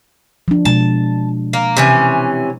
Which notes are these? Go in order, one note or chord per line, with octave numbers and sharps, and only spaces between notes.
F3 D4
B2 G#3 A5
A#3
C3 E3 C#4